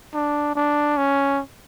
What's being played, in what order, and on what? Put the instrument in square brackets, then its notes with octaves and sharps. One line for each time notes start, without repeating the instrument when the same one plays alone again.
[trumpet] D4
D4
C#4